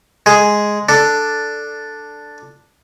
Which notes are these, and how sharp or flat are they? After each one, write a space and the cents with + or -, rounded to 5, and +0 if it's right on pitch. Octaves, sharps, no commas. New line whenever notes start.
G#3 +0 G#4 +0
D4 +0 A4 +5